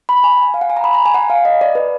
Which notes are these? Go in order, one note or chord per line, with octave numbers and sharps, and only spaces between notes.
B5
G#5
F5
F#5
G#5
A#5
B5
A#5
G#5
F#5
F5
D#5
D5
B4